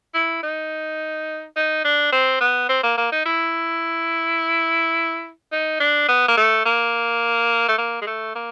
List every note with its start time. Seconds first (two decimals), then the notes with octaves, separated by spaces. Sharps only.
0.14 E4
0.43 D#4
1.56 D#4
1.85 D4
2.12 C4
2.40 B3
2.69 C4
2.83 A#3
2.98 A#3
3.12 D#4
3.26 E4
5.52 D#4
5.80 D4
6.08 B3
6.28 A#3
6.37 A3
6.65 A#3
7.68 A3
7.78 A#3
8.02 G#3
8.07 A3
8.35 A#3